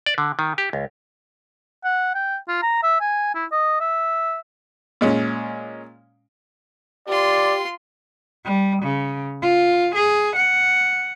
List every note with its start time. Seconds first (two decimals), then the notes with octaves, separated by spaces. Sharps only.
0.06 D5
0.18 D3
0.39 D#3
0.58 G4
0.73 C#2
1.84 F#5
2.15 G5
2.48 F4
2.62 A#5
2.83 E5
3.00 G#5
3.35 E4
3.52 D#5
3.80 E5
5.01 A#2 G#3 C#4
7.08 F4 G4 D5 C6
8.45 G3
8.83 C#3
9.42 F4
9.95 G#4
10.36 F#5